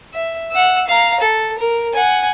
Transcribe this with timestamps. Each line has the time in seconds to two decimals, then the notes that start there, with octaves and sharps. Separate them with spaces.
0.14 E5
0.51 F#5 E6
0.87 F5 A#5
1.20 A4
1.58 A#4
1.93 F#5 G#5